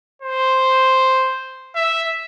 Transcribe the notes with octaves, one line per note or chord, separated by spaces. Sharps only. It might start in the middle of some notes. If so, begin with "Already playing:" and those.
C5
E5